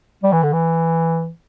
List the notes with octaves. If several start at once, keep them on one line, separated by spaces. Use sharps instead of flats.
G3
E3
D3
E3